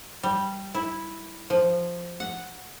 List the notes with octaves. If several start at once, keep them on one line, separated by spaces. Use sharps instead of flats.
G3
E4
F3
F#5